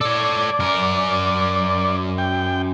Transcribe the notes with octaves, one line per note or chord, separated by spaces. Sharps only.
A4 C#5 D5
F#2 A#4
G5